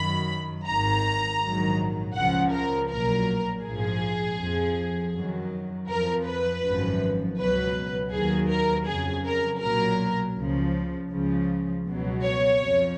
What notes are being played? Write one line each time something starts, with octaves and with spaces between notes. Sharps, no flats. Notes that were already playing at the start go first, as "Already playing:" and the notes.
Already playing: F#2 D#3 F#3 B5
G#1 G#2 D#3 A#5
A#1 G#2 D#3 F#3
C#2 C#3 F3 F#5
A#4
B1 A#2 F#3 A#4
A#1 G#2 F3 G#4
F2 F3
F#2 D#3 F#3
F2 F3 A#4
B4
G#1 F#2 F3
C#2 B2 F#3 B4
D#2 D#3 F#3 G#4
A#4
F2 C#3 F#3 G#4
A#4
B1 A#2 F#3 A#4
C#2 C#3 F3
C#2 C#3 F3
C#2 B2 F#3
C#5
F2 F3